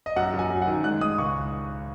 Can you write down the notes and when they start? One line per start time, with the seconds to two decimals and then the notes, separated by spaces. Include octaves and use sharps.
0.06 D#5
0.16 F#2 F#5
0.34 F#2
0.39 G#5
0.50 F#2
0.62 F#5
0.67 D#3
0.84 G#3 F#6
1.01 G#3 D#6
1.18 C#2 C#6